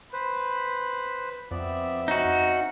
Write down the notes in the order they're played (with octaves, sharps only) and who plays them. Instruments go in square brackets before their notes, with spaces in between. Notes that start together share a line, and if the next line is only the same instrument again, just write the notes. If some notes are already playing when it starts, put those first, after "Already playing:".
[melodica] B4 C5 [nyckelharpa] B5
[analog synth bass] F2 [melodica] B3 D5 [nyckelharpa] C4 E5
[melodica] C#4 [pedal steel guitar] D#4 F#4